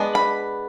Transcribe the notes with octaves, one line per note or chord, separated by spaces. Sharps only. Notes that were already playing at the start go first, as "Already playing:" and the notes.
Already playing: G#3 B3 D4
B5